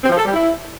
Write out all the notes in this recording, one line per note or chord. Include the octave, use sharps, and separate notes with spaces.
C4
F3
A4
G3
E4